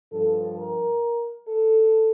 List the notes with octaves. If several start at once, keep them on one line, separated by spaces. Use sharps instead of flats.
G2 F3 A4
A#4
A4